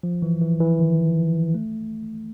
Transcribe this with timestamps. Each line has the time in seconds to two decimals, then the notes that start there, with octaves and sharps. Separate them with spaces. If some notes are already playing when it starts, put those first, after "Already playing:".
0.03 F3
0.22 E3
0.41 E3
0.60 E3
0.79 D#3
1.55 A3